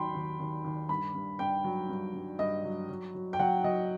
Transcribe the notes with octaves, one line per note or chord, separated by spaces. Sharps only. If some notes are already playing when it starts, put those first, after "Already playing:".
Already playing: D#2 D#3 F#3 G5 B5 C6
D#2
D#2
D#2
G2 B5
G2
G2 G5
F#3
G2
G2
G2 D#5
F#3
F#3
F#3
G5
F#3 F#5
F#3 D#5